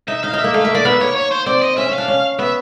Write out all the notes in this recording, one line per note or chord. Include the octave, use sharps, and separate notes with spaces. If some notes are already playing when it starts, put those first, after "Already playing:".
D#4 E5
D#4 F5
D#4
E5
A#3
A3 F5
A#3 E5
A#3 D5
B3 E5
A#3 C#5
C#5
C5
C4 D5
D#5
C#4 E5
C#4
F5
D4
C#4
B3 E5